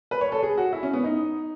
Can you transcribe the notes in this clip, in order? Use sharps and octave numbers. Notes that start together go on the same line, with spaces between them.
B4
C#5
A4
G#4
F#4
E4
C#4
B3
D#4